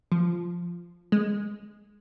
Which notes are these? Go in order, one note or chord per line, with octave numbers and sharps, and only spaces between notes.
F3
G#3